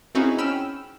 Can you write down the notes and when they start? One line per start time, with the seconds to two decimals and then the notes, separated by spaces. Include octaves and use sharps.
0.15 C4 C#4 D#4 E4 F#4 G#4
0.38 C#4 G5 B5 E6 F6 E7